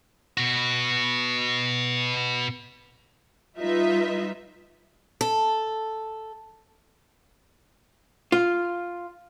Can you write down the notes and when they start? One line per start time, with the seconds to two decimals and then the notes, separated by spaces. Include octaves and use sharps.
0.37 B2 F#4
3.58 G3 D#4 F4 B4 D#5 E5
5.21 A4
8.32 F4